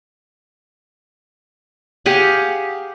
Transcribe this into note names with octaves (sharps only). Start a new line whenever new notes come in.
G4 G#4 F5 F#5